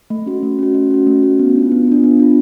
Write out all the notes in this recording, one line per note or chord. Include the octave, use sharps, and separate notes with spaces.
A3
C#4 F#4
A3
C#4 F#4
A3
C#4 F#4
A3
C#4 F#4
B3
D4 F4
B3
D4 F4
B3
D4 F4